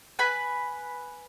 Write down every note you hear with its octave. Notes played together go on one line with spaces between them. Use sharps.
B4 G#5 B5